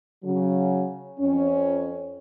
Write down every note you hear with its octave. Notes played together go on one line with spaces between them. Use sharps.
C#3 F#3
F2 C#4